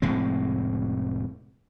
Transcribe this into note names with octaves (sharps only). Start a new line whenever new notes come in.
F1 A2 G#3 C4